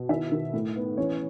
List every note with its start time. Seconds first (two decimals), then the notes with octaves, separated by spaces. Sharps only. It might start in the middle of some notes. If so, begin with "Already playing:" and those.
Already playing: B2
0.09 D#3 E4 E5
0.32 D#3
0.54 A2
0.76 B3
0.97 E3 C#4 C#5